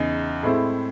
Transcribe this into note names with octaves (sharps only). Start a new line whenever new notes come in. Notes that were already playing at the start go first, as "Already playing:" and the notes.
Already playing: E2 C#3 D#4
A2 G#3 C4 E4